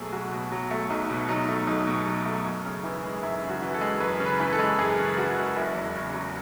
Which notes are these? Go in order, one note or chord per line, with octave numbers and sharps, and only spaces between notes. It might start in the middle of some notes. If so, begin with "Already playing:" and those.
Already playing: B1 B2 F#3 A3 F#4 G#4
B1 F#4
B2
F#3
A3
B1 D#4
B2
F#3 D#4
A3
B1 D#4
B2
F#3
A3
F#2
C#3
E3
G#3
F#2 E4
C#3
F#4
E3
A4
G#3
F#2 B4
C#3
B4
E3
A4
G#3
F#2 G#4
C#3
E3 F#4
G#3
F#1 E4
E2
C#3
F#3